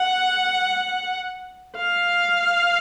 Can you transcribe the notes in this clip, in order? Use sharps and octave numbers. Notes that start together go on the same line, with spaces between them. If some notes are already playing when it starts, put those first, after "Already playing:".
Already playing: F#5
F5